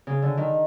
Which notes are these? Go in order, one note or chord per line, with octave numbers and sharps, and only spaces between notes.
C#3
D3
D#3